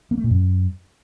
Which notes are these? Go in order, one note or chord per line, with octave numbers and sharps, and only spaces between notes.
A#3
A3
A#2
F#2